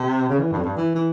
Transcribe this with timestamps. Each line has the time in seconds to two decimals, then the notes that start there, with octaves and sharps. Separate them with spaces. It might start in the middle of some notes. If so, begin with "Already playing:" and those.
Already playing: C3
0.29 C#3
0.39 E3
0.52 G2
0.58 F2
0.64 G2
0.77 E3
0.95 E3